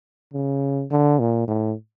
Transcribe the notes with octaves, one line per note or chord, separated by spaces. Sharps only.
C#3
D3
A#2
A2